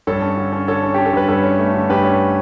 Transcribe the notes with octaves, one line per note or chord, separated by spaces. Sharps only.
G2 A4 C#5
C#4
D3
C#4
D3 A4 C#5
C#4
C#4 G4
A4
G2 B4
G2 A4 C#5
C#4
A3
D3
G2 G4 B4
C#4